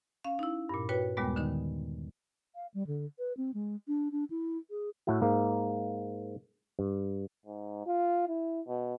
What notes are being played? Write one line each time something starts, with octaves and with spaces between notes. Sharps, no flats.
C#4 F5
D#4 E4
G2 A#2
F#4 B4 C#5 G5
D#2 A#2 G3 G#3 B3
D3 D#3 D#4
F5
G3
D3
B4
C4
G#3
D4
D4
E4
G#4
A2 A3 E4 F#4
G#2 A#3
G2
G#2
F4
E4
B2